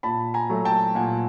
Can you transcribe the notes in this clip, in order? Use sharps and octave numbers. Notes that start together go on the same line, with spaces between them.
A#2 A5 B5
G#5 A#5
F#3 A3
G5 A5
A#2 F#5 G#5